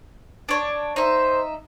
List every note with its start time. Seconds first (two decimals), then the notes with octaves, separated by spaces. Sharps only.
0.49 D4 C#5
0.96 D#4 C5 E5